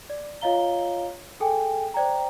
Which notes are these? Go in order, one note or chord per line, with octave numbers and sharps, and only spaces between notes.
D5
F4 C#5 D#5 F5 A#5 G7
G#4 A4 G5 G#5
C5 D5 G5 A#5